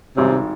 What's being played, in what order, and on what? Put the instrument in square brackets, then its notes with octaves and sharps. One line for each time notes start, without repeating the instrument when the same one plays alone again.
[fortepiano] G#1 G#2 G3 C#4 [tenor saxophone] C3